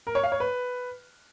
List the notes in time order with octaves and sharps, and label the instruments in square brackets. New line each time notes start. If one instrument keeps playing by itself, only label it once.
[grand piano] A#4
C#5
F5
C#5
B4